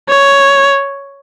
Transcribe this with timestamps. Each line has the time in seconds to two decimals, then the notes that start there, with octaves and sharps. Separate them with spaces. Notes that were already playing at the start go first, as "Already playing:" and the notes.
0.09 C#5